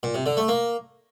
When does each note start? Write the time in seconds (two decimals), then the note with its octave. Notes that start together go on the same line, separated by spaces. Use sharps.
0.03 A#2
0.15 C3
0.26 D3
0.37 A3
0.48 A#3